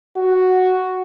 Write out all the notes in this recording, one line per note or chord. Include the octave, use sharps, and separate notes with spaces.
F#4